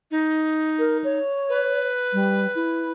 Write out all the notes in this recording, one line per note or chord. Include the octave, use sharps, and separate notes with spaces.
D#4
A#4
C#5
B4
G3
E4